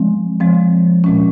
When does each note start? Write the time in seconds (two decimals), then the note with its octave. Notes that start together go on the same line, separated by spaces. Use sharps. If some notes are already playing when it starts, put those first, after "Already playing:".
Already playing: F3 G#3 C4
0.40 F3 G#3 C4
1.04 A#2 G#3 C#4